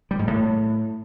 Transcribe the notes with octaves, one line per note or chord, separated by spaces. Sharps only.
G3
G#2
A2